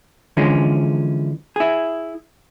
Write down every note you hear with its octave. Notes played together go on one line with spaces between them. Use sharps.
D3 E3 F3 G#3 C#4
E4 G#4